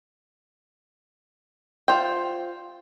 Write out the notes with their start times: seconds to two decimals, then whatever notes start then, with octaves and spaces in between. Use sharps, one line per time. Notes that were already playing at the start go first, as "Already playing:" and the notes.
1.88 F4 C5 G5